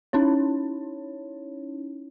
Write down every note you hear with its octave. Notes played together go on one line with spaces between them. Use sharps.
C#4 D#4 E4 C#5